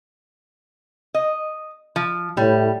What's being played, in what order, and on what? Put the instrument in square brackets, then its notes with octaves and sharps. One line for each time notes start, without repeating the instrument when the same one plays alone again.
[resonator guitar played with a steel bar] D#5
F3
[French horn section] A2 [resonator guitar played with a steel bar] G3